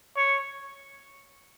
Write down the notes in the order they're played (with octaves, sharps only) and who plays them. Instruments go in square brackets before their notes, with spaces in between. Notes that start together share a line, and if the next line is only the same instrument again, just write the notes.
[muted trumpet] C#5